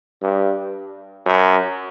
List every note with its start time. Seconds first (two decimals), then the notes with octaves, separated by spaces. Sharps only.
0.22 G2
1.26 F#2